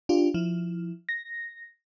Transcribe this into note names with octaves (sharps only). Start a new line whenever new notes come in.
D4 F4 G4
F3 E4
A#6